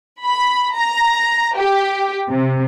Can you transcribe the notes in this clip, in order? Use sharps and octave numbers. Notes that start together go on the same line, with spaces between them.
B5
A#5
G4
C3